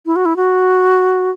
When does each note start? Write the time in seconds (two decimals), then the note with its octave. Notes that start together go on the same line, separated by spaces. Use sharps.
0.06 E4
0.16 F#4
0.25 E4
0.36 F#4